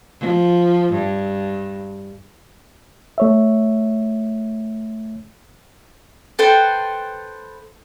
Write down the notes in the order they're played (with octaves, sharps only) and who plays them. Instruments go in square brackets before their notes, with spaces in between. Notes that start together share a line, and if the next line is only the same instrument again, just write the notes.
[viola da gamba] F3
G2
[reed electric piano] A3 C#5 E5
[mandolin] A4 B4 C5 G5